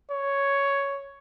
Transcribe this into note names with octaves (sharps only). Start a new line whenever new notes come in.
C#5